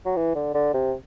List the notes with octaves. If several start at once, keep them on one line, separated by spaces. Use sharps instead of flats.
F#3
E3
D3
D3
C3